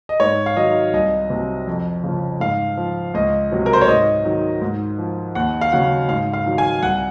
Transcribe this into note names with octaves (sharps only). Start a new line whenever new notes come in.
D#5
G#2 C#5
F5
D#3 F#3 D#5
C2 D#5
C3 F#3
F2
C#3 F3
G#2 F5
F3
C#2 D#5
C3 F#3
A#4
C5
C#5
G#2 D#5
D#3 F#3
G#2
F3
D#2 F#5
F5
C#3 F#3 F#5
G#2 F5
F5
D#3 F#3
G#5
C2 F#5